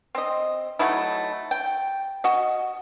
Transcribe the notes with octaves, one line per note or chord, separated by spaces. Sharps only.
C4 D#5
F#3 A3 D#4 E4
G5
F#4 D#5